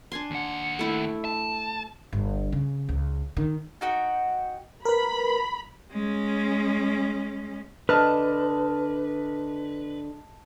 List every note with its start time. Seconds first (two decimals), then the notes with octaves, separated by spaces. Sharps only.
0.12 D4 G#5 C6
0.31 D#2 F#5
0.79 A3 E4 G5
1.25 A5
2.13 G1
2.52 C#3
2.89 C#2
3.37 D#3
3.81 D#4 F#4 G5
4.85 A#4 B4 B5
5.92 G#3 C#4
7.89 D3 B4 D#5 A5 F6